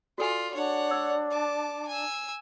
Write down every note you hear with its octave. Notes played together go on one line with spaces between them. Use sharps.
F4 F#4 A4 D5 G#5
D4 C#5 F#5
D5 E6
A5 D6
G#5 E6